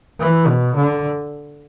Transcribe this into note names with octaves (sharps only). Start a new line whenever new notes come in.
E3
B2
D3